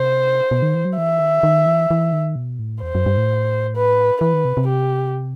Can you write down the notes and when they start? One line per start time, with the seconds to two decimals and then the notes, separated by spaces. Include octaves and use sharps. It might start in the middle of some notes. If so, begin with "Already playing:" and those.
Already playing: C3 C5
0.51 B2
0.62 D#3
0.75 E3
0.85 F#3
0.97 E3 E5
1.20 D#3
1.43 D#3
1.66 E3
1.91 E3
2.13 D#3
2.36 B2
2.59 A2
2.83 E2 C5
2.95 F#2
3.06 G2
3.17 A2
3.76 B4
4.21 E3 B4
4.34 D#3
4.45 C3
4.57 C3
4.68 G4